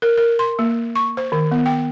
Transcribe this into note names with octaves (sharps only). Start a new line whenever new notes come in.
A#4
A#4
C6
A#3
C#6
C5
D#3
B3
G5